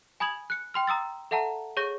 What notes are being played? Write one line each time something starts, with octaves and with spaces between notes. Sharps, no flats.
G#5 B5 D#6 G#6 F#7
F#6 C#7
G5 C6 F6
A#5 D#6 E6 A6
A4 E5 F#5 A5 A#5
G#4 C#5 C#6 G6 A#6